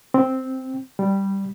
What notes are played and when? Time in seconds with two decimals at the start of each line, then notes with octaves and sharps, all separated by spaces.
0.14 C4
0.99 G3